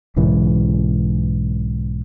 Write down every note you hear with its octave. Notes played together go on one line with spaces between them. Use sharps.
B1 G#2 C#3 E3